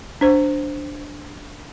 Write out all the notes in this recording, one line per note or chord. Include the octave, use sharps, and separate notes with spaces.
D4 C5